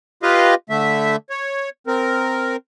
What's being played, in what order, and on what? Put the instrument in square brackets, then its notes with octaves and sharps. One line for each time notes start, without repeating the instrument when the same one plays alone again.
[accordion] F4 G4 B4 D#5 F5
D3 A3 E5
C#5
C4 A#4